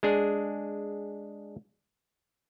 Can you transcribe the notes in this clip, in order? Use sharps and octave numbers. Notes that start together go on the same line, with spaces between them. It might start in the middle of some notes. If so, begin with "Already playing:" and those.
G#3 D4 G#4